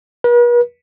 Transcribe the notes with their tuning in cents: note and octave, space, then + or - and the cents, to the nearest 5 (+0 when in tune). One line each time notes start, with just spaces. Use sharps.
B4 -45